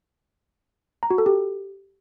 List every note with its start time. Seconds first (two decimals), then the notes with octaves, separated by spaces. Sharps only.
1.03 A#5
1.10 F#4
1.18 A4
1.26 G4